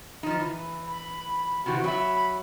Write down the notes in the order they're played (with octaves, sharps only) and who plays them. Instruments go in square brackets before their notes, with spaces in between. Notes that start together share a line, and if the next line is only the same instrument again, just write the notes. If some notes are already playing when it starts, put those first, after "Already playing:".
[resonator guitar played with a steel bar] F3 D#4
E3
[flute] B5
[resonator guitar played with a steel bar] C3 E3 [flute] F#4
[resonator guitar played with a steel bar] F#3 E5 [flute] B5